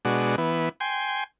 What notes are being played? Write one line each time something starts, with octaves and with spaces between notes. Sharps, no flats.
B2 G#3 D4 F#4
E3 B3
G5 G#5 C6